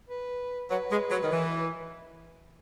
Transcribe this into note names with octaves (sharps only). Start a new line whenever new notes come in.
B4
F#3 B4
G#3
F#3
D#3
E3